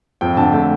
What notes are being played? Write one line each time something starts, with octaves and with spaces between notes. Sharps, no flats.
F2 G5
D3 A5
A3 G5